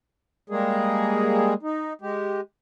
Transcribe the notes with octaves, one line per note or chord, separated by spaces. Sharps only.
G3 G#3 A#3 G#4
D#4
G#3 G4